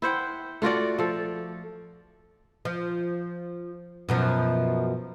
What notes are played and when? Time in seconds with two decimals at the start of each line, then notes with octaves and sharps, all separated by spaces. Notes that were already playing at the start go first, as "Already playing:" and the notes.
0.02 E4 C5 F#5 G5
0.62 A3 F4 F#4 D5
0.98 F3 A4
2.65 F3
4.09 F#2 B2 F3